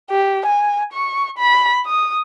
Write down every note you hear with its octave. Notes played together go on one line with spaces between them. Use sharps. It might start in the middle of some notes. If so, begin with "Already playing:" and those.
G4
G#5
C#6
B5
D#6